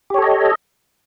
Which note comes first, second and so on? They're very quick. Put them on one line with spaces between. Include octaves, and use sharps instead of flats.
G4 C#5 A4 D#5